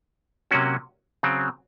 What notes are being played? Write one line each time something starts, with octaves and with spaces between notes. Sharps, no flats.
C3 F#3 A#3 C#4 F#4
C#3 F#3 C4